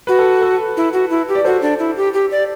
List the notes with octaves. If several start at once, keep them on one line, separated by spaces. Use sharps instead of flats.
F#4 B4
A4
A4
E4
F#4
E4
G4
D5
F#4 A4 C5
D4
E4
G4
G4
D5